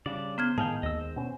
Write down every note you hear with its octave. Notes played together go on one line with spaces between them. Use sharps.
C#3 G3 D4 D5
B3 C5 F6 G#6
A2 D#3 G#3 G#4 F5 G5 A5
D#2 D#5 E6
C5
B2 B3 C#4